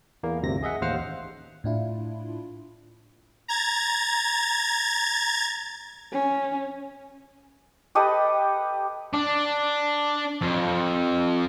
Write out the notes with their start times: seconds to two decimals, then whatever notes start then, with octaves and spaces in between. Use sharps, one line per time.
0.23 E2 A#3
0.42 G1 D2 C3 A#6
0.63 G#4 D#5 E5 F#5
0.82 A1 D#2 C5 F5 F#5 F6
1.64 A2 D4 E4 F4
3.48 A#5 G#6 A6
6.13 C#4
7.95 G4 A4 B4 D#5
9.13 D4
10.41 F2